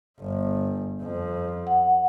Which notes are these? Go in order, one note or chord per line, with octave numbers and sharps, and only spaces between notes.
G1
F2
F#5